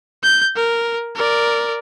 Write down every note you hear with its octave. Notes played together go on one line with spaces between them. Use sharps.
G6
A#4
A#4 D5